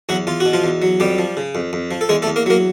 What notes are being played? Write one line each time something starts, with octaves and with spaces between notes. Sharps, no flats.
E2 F#3 F#4
E2 F4
F#4
B2
F3 F4
E2
F#3
F2 G3 G4
F3
C#3
F2
F2
F3
A4
E2 G#3 G#4
A3 A4
E2
A#3 A#4
F#3 A#3 A#4